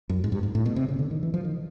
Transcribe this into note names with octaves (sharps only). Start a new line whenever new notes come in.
F#2
G#2
G2
G#2
A2
B2
C3
C#3
D3
D#3
E3
F3
D#3